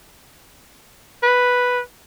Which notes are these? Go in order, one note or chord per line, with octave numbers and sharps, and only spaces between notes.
B4